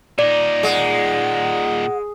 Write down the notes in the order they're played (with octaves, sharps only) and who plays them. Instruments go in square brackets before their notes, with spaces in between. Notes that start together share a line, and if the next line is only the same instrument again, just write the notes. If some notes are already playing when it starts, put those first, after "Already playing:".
[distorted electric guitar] A#2 D#4 [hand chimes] D5
[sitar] G#3 [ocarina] F#5